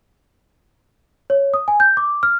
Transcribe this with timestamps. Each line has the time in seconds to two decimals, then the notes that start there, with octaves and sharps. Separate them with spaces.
1.30 C#5
1.54 D#6
1.68 G#5
1.80 G6
1.97 D6
2.23 F6